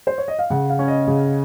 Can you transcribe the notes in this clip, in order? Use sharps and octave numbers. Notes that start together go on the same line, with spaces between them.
C5
C#5
D#5
F5
C#3 F#5
F5
C#4
D#5
C#3